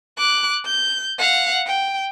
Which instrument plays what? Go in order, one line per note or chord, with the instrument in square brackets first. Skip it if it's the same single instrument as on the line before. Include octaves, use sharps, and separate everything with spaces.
[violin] D6 F#6
G6
F5 F#5
G5